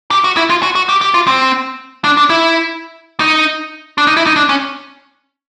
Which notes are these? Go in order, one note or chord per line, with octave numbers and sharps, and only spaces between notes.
G4
F#4
E4
F4
F#4
F#4
G4
G4
F4
C4
D4
D4
E4
D#4
D4
D#4
E4
D#4
D4
C#4